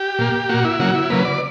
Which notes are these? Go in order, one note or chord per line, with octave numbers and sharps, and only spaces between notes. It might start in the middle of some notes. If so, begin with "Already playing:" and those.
Already playing: G4
A#2 A#3
A#2 A#3 F#4
E4
C#3 F#3 A#3 F#4
E4
C#3 F#3 A#3 B4
D5